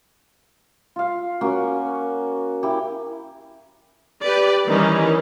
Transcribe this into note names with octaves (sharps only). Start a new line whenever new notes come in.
F4 F5
A#3 C#4 F#4
E4 G4
G4 B4 D5
D#3 E3 G3 C#4 D#4